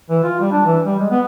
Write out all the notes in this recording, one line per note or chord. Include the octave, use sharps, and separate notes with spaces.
E3
F4
G3
D4
E3
G3
G#3
B3